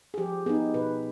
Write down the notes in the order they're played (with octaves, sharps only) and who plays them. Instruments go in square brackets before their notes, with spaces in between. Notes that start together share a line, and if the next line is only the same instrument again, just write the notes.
[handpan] G#4
F3 G4
B3 D#4 G#4
B2 B4